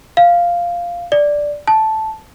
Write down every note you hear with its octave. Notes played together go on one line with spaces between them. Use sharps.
F5
D5
A5